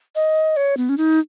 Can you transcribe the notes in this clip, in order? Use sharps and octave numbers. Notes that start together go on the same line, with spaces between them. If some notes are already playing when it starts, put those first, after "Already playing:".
D#5
C#5
B3
C#4
D#4